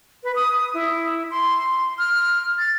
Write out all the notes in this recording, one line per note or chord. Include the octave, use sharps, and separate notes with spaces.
B4
D#6
E4
C6
F6
A6